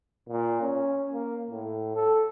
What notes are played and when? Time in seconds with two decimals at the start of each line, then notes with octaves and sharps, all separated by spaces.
0.29 A#2
0.61 C#4
1.13 A#3
1.50 A2
1.96 A4